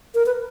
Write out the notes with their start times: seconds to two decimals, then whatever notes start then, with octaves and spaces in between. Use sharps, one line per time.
0.15 A#4
0.26 B4